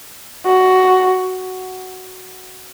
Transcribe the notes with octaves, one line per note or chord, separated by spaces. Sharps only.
F#4